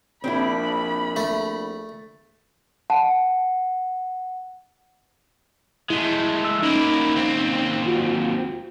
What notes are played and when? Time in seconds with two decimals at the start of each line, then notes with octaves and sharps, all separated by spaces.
0.24 A#1 C4 D4 E4 B5
1.16 A3
2.90 F#5 A5
5.90 G#3 A3 E4
6.45 E6
6.63 A#3 C#4 D#4 E4
7.16 D#2 C4
7.86 F4 F#4